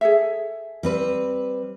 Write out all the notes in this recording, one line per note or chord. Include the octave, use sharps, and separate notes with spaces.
G#4 A4 E5
G3 C4 B4